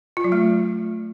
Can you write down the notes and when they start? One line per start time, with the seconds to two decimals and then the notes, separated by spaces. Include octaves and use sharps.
0.17 F4
0.24 F#3
0.32 A3